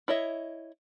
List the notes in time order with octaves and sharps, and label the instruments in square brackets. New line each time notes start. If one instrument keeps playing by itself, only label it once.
[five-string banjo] E4 C#5 D#5 E5